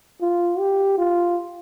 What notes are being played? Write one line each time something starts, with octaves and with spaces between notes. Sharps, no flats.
F4
G4
F4